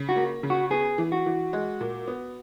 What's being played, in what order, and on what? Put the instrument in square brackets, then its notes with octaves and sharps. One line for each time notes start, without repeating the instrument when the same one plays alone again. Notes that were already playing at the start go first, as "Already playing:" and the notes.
Already playing: [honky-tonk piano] C#3
[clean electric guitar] F#4
[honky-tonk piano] A#3
C#3
[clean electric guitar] F#4
[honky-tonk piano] B3 [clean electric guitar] G#4
[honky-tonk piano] E3
[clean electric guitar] F#4
[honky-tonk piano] E3
G#3
A#2
B3